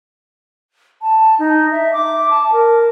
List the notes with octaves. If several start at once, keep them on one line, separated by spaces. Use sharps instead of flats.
A5
D#4
E5
D6
A5
A#4